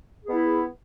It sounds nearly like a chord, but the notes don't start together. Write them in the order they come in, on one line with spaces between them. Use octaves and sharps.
G#4 B3 E4